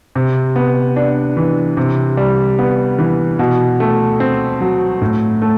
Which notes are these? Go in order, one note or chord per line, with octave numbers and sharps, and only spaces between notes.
C3
B3
D4
E3
C3
G3
B3
E3
B2
A3
C4
F#3
A2
A3